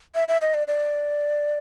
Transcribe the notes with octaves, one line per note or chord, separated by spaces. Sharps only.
E5
E5
D#5
D5
D5